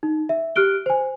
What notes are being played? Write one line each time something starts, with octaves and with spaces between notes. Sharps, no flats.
D#4
E5
G4 F6 F#6 D7 G7
C5 G#5